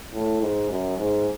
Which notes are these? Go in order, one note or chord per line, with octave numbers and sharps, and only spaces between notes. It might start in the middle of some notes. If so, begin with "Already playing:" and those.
A2
G#2
F#2
G#2